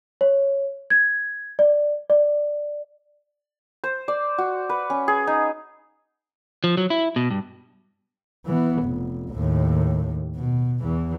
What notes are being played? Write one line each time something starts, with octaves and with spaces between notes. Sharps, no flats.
C#5
G#6
D5
D5
C5
D5
F#4
B4
C#4
G#4
D#4
F3
F#3
E4
B2
G2
E3 B3
F1
D#2 A2
B2
E2 E3